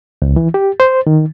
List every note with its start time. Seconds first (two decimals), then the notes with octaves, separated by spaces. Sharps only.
0.22 C#2
0.36 E3
0.54 G4
0.80 C5
1.07 D#3